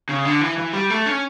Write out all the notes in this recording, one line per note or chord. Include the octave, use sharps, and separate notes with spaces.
C#3
D3
E3
E3
G3
A3
C#4